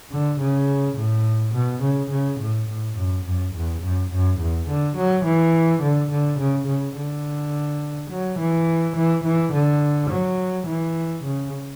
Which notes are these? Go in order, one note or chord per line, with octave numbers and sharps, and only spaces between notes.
D3
C#3
A2
B2
C#3
C#3
A2
A2
F#2
F#2
E2
F#2
F#2
E2
D3
F#3
E3
D3
D3
C#3
C#3
D3
F#3
E3
E3
E3
D3
F#3
E3
C#3